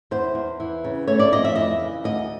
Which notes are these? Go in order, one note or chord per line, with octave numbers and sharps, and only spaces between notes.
E2 C5
E2
E3
C#3
A3 C#5
D5
F2 D#5
E5
E3 D#5
C#3
D2 D#5